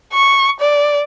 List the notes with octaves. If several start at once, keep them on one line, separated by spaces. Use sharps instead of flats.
C#6
D5